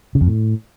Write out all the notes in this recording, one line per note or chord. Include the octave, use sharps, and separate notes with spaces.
C#3
F2
A2